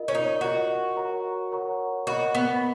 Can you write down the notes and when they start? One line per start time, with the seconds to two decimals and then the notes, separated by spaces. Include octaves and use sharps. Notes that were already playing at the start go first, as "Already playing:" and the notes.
Already playing: F4 A#4 D#5
0.08 C#4
0.15 D#4
0.41 F4 F#4 A#4 D#5
0.97 A#4 C#5 F#5 A#5 C#6
1.52 A#4 C#5 F#5 A#5 C#6
2.07 F#4 A#4 D#5 F#5 B5
2.35 B3